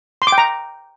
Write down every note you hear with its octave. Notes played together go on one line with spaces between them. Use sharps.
C6
D6
G5
A#5